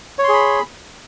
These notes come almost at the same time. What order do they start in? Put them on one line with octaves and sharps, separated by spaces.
C#5 C6 G#4 B5